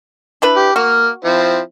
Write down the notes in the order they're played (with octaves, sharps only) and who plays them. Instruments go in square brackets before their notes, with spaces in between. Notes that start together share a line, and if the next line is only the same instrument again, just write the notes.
[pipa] D4 E4 B4
[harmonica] G4
[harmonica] A#3 F6 [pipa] F#4
[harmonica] F3 C4 E4